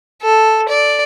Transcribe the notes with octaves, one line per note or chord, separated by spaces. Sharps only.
A4
D5